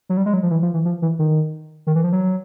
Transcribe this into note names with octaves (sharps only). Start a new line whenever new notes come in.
F#3
G3
G#3
F#3
F3
E3
F3
E3
F3
E3
D#3
D#3
E3
F3
F#3